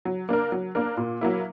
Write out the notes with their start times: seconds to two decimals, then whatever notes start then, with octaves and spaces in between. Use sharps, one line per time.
0.05 F#3
0.29 A#3 D4 A#4
0.52 F#3
0.75 A#3 D4 A#4
0.97 A#2
1.21 F#3 A#3 E4